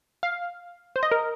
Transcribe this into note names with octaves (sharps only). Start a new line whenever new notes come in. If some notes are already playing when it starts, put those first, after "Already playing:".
F5
C5
D#5
A#4